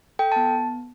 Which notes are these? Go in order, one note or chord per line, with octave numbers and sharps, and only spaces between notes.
A4 G5
A5
B3